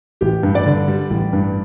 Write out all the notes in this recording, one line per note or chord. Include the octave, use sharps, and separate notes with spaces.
A1 G4
G2
D5
D3
G3
A1
G2